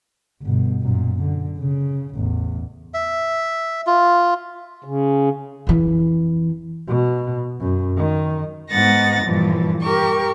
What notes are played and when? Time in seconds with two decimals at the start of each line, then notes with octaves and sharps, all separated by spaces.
0.42 G1 B2
0.82 F#2 A#2
1.22 D3
1.59 C#3
2.15 A1 E2
2.94 E5
3.87 F4
4.84 C#3
5.67 F2 E3
6.87 B2
7.60 F#2
7.97 D#3
8.71 G#2 B3 D#4 F#5 A6 A#6
9.24 G2 A#2 E3 F3
9.83 G4 A#4 C#6